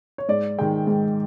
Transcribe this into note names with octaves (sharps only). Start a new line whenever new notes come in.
C#5
G#2 D5
D#3 G#3 G5
G#2